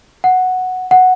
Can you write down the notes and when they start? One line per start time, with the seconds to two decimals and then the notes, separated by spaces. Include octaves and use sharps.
0.24 F#5
0.91 F#5